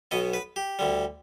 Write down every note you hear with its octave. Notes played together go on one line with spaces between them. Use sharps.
B1 B2 B3 D#5
B4
G4
D2 D3 G3